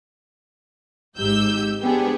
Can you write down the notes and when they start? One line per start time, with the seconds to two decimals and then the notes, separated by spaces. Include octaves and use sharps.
1.18 G#1 G#2 D#4 G4 E6 G6
1.82 B3 C4 D4 G4 G#4